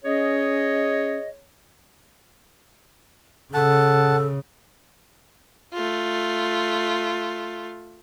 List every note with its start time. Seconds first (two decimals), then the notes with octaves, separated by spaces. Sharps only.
0.04 C#4 G#4 C#5 D#5
3.54 C#3 A4 F#5 A5
5.73 A3 F4